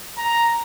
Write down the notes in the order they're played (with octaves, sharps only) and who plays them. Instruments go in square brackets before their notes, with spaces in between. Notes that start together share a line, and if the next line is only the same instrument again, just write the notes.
[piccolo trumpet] A#5